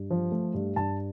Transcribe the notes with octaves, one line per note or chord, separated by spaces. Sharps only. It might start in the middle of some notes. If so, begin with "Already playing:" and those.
Already playing: G2
F3
A3
G2
G2 A5